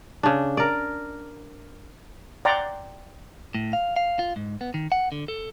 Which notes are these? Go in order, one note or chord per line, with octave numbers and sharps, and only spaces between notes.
C#3 D4
A#4 D5
D5 F#5 G5 A#5 C6
A2
F5
F5
F4
G#2
B3
D#3
F#5
D3
A4